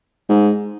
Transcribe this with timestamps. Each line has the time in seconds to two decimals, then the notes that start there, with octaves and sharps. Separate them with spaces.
0.29 G#2